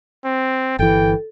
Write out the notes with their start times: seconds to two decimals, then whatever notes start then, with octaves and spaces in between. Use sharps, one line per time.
0.25 C4
0.79 G1 E3 A4 G5